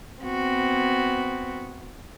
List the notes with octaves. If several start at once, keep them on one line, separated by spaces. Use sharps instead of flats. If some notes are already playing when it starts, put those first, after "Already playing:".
B3 C4 F#4